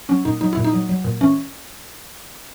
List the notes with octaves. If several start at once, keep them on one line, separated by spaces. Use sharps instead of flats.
F#3 C#4
A#2 D#4
F#3 D#4
A#2 E4
D#4
F#3
F#3
A#2
E3 C#4